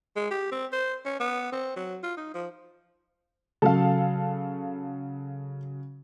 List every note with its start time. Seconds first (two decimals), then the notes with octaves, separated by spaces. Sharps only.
0.16 G#3
0.31 G4
0.52 C4
0.72 C5
1.05 C#4
1.20 B3
1.52 C4
1.76 F#3
2.03 F4
2.17 D#4
2.34 F3
3.62 C#3 F#3 A4 F5